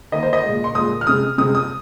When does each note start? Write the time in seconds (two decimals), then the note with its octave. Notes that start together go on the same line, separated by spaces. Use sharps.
0.12 D#3 A#3 D#5
0.23 C5
0.33 D#5
0.44 G#3
0.49 A#2
0.64 C6
0.75 A#2 G#3 D#6
1.01 F6
1.07 C3 G#3 D#6
1.38 C3 G#3 D#6
1.55 D#6